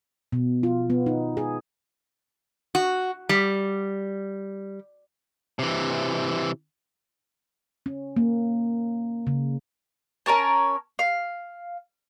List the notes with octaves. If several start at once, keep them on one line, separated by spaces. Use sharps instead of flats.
B2
F4
B3
D#4
G#4
F#4
G3
C3 E3
C#4
A#3
C#3
C#4 A#4 C#5 A5
F5